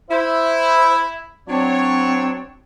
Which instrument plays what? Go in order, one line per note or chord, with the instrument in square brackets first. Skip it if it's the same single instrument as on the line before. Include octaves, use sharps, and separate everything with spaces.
[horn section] E4 [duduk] C5
[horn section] F#3 D4 C#5 [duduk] C4